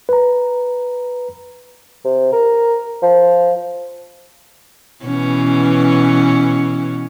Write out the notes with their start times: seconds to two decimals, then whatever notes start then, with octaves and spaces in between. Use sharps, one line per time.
0.09 B4 A#5
2.05 C3
2.33 A#4
3.03 F3
5.05 B2 E3 C#4